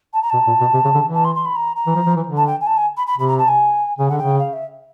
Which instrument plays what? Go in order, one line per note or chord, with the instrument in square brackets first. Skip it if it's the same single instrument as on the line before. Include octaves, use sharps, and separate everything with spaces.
[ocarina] A5
A#5
[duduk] B2 [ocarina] A5
[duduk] A#2
B2
C3
C#3
D3
E3
[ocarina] A5
C6
C6
B5
A#5
A#5
[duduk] E3
F3
F3
E3
D3
[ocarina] A5
G5
G#5
A5
G#5
B5
B5
[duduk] C3 [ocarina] B5
[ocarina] A#5
A5
G#5
[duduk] C#3 [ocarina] G#5
[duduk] D3 [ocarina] F#5
[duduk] C#3 [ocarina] G5
[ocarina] F5
E5